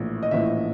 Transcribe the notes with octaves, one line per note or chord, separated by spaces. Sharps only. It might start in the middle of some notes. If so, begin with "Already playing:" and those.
Already playing: A#1 A2 E3
D#5
A#1 A2 E3 E5